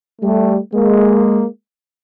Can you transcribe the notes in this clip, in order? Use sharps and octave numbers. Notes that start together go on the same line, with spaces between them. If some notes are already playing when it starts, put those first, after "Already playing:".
G3 A3
G#3 A#3